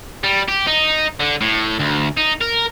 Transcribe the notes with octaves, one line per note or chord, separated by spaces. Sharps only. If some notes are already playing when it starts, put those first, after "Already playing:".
G3
G4
D#4
D3
A2
D2
D#4
A#4